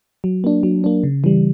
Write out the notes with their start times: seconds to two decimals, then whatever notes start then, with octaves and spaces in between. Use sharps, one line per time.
0.24 F#3
0.44 A#3 D4
0.63 F#3
0.84 A#3 D4
1.04 C#3
1.24 E3 G3